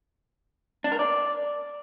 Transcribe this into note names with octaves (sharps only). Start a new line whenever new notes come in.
D4
A#4
D5